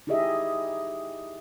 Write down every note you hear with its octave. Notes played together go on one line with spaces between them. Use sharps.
D#4 E4 G4 G#4 D#5 E5